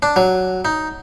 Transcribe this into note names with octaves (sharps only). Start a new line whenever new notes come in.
D4
F#3
D#4